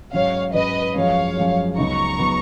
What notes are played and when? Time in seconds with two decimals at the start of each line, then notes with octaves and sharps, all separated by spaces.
0.13 G#2 F#3 C#4 C#5 F5
0.54 G#2 F#3 C#4 B4 D#5
0.95 F#2 F3 G#3 C#5 F5
1.36 F#2 F3 G#3
1.78 C#2 C#3 F#3 B3 D#4 A#5 C#6
2.18 C#3 F#3 B3 D#4